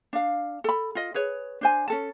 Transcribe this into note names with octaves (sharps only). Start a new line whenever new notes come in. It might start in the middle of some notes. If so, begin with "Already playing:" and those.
D4 F5
A4 B5
F4 D#5
G#4 B4 C#5
D4 C5 G#5
C#4 A4 A5